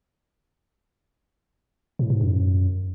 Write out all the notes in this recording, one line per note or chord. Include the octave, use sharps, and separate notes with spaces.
A2
G#2
F#2